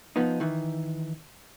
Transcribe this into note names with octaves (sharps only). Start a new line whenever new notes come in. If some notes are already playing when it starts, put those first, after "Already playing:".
F3 B3 D#4
D#3 E3